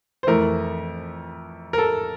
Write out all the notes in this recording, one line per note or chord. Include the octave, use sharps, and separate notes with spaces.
C5
F2 E3 A3 A#4
A#4
A4